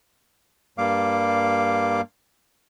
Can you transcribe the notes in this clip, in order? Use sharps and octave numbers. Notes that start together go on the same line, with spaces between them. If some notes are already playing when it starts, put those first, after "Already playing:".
G2 G3 A#3 F5 D6